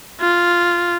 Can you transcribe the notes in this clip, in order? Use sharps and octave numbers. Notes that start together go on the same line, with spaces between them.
F4